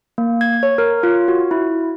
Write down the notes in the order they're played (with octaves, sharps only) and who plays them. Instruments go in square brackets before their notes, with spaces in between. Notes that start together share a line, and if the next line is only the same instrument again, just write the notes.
[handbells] A#3
G#6
C#5
A#4
F4
F#4
E4